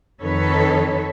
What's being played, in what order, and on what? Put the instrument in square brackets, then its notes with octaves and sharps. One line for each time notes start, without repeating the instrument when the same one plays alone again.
[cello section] F2 D#3 A4 B4 C#5